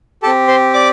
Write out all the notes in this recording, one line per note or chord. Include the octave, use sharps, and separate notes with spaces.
C4 G4 A4 A5
C5 C6
D5 D6